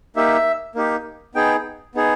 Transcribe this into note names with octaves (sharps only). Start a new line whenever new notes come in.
A#3 D#4 G4 E5
A#3 D#4 G4
B3 D#4 G#4 G5
B3 D#4 G#4